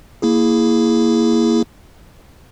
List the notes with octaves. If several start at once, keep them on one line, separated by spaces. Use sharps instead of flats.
A#3 E4 G#4